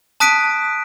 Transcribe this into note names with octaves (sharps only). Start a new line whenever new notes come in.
A5 D#6 F#6 B6 D7 D#7